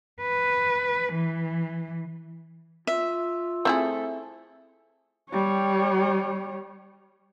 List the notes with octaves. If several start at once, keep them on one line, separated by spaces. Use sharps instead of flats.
B4
E3
F4 E5
A3 C4 E4 G#4
G3 C#5